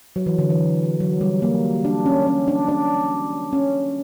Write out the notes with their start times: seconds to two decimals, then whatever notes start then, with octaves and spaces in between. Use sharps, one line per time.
0.16 F#3
0.26 E3
0.38 D3
0.50 E3
1.00 F#3
1.21 G3
1.42 A#3
1.85 D4
2.06 C#4
2.27 C#4
2.48 D4
2.69 D4
3.53 C#4